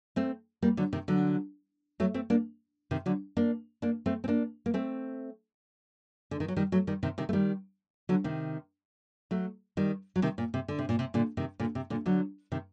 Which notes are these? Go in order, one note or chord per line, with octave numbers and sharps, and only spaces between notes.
A3 C4
G3 A#3
D3 F#3
C3 D#3
D3 F#3
F#3 A3
A3 C4
A#3 D4
C3 D#3
D3 F#3
A#3 D4
A#3 D4
A3 C4
C4
A#3 D4
A#3
A3 C4
D3
D#3
F#3
D#3 G3
F#3 A3
D#3 G3
C3 D#3
C3 D#3
A3
D#3 G3
D3 F#3
C3 D#3
F#3 A3
D#3 G3
F#3
C3 D#3
A#2
C3
D3
C3
A#2
C3
A#2 D3
C3 D#3
A#2 D3
C3
A#2 D3
D3 F#3
C3 D#3